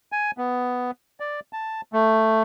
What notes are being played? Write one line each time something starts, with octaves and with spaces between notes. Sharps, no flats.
G#5
B3
D5
A5
A3